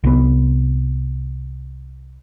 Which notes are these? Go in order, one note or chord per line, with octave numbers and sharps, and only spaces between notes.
C2 B3